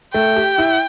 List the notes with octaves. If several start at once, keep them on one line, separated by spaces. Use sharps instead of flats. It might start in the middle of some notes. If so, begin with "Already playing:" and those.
A3 G5
G4
E4